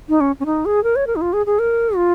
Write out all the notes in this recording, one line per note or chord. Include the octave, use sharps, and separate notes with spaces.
D#4
C#4
C#4
D#4
G#4
A#4
C#5
A#4
D#4
F4
G#4
G#4
A#4
F4